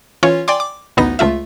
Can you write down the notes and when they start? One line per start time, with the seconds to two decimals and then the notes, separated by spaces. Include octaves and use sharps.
0.23 E3 C#4 F4 C#5
0.48 D5 G5 G#5 C6 D6
0.60 D6
0.97 A1 D2 B3 D#4 A#6
1.19 C#2 A3 F4 E5